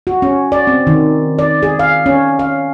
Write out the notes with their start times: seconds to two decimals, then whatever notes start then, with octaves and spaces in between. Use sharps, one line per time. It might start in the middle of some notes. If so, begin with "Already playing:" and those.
0.07 F#4
0.22 C#4
0.52 D5
0.67 C4
0.87 D#3
1.39 D5
1.63 G#4
1.79 F5
2.06 C#4
2.39 F5